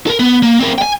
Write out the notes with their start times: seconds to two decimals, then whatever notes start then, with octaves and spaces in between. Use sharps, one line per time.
0.07 A4 A#4
0.19 B3
0.43 A#3
0.60 C4 A#4
0.78 G5 G#5